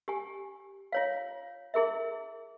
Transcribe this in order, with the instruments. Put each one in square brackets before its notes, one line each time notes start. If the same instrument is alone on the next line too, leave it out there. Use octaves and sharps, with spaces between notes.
[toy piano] G4 G#5
F4 C#5 F5
E4 G#4 A#4 E5